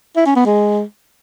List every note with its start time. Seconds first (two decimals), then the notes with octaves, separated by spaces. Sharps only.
0.16 E4
0.26 C#4
0.36 B3
0.46 G#3